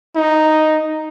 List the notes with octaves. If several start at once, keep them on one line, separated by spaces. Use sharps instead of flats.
D#4